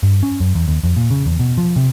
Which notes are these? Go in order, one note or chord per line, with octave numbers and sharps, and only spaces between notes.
G2
C#4
F#2
E2
D#2
F2
A#2
C#3
E2
B2
F3
C3